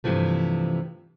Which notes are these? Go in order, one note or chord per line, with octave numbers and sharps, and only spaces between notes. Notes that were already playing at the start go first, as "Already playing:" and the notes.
G2 C3 E3 F3 A3